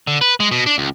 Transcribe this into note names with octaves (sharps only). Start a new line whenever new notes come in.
D3
B4
G#3
B2
D4
C#2